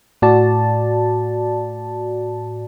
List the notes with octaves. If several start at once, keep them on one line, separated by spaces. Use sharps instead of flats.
A2 F#4 D5 A5